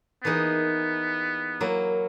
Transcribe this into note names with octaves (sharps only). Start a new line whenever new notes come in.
E3 A#3 B3 D#4 G#4
F#3 A#3 E4